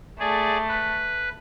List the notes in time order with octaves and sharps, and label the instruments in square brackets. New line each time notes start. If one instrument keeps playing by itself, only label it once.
[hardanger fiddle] A3 [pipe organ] G#4 D5
[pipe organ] B4